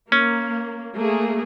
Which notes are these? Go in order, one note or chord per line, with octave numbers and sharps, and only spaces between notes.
A#3 C#4
A3 A#3 G#4